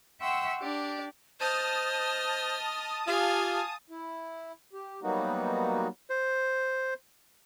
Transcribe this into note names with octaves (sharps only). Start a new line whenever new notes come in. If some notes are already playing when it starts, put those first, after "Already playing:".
E5 F#5 G5 C6 C#6 E6
D4 G4 D5
C5 D#5 A5 D#6 F6
F4 G4 F5 G#5
E4
G4
F#3 G3 A#3 B3 D#4 F#4
C5